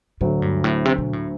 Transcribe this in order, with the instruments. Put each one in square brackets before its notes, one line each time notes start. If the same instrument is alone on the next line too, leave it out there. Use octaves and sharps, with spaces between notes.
[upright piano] D2 D3 F#3 [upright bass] A2
[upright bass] G2
A2
C3
B2
A2